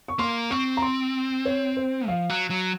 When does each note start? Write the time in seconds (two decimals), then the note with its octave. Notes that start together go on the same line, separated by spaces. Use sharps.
0.08 C#6
0.19 A#3 C6
0.50 C4 C#6
0.77 A#5
0.82 C6
1.45 C#5
1.77 C5
2.08 F3 F5
2.30 F#3
2.50 F#3